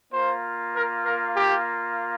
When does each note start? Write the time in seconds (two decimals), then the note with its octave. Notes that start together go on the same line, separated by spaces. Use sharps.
0.12 A#3 F4 C5
0.75 A#4
1.05 A#4
1.36 G4